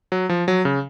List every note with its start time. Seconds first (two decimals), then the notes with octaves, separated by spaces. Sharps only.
0.12 F#3
0.29 F3
0.48 F#3
0.65 C#3